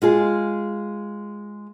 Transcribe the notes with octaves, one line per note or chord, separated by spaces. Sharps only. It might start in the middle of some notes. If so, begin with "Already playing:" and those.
G#3 F4 G#4